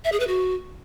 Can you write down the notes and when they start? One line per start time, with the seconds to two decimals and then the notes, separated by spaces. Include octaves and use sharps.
0.05 E5
0.12 G#4
0.20 B4
0.27 F#4